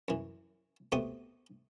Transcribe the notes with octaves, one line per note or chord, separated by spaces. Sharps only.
F#2 E3
B2 A3 C4 G4 D#6